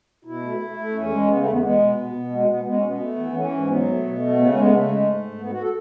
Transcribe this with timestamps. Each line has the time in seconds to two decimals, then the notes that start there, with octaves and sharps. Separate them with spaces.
0.25 B2 E4
0.43 A3
0.60 A3
0.77 A3
0.93 E2 C#4
1.10 G#3
1.27 C#3 B3
1.39 A3
1.45 E2
1.50 B3
1.62 G#3 B3
1.79 B2
1.96 B2
2.13 B2
2.31 G#3
2.48 B2 B3
2.65 G#3 B3
2.74 C#4
2.82 B2 B3
2.99 A3
3.16 E3
3.33 E3 C#4
3.50 G#2
3.67 F#3 B3
3.85 A3
4.02 B2
4.18 A3
4.35 C#3 B3
4.47 C#4
4.53 G#3
4.59 B3
4.70 C#3 A3
4.87 G#3
5.04 G#2
5.22 G#2
5.39 G#2 B3
5.51 F#4
5.61 A4